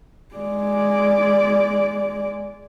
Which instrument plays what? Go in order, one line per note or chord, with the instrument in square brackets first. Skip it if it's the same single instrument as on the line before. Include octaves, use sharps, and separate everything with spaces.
[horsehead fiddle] G#3 D5